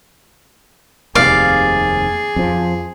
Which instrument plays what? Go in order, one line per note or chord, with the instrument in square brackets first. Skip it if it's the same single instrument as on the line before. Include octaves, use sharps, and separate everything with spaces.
[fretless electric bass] F1 D#2 C3 [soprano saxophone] G#4 [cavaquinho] D5 F5
[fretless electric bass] F2 F3